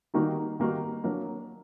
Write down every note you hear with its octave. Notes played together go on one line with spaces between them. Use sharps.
D#3 G3 A#3 D#4 F#4
D#3 G3 A#3 D#4 F#4
F#3 A#3 D4